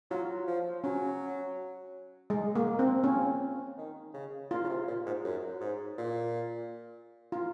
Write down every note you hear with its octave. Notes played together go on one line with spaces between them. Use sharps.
F#3 F4
F3
F#3 C#4
G#3
A#3
C4
F3 C#4
D#3
C#3
A#2 F4
C#3
C3
A#2
G#2
F#2
G#2
A#2
F4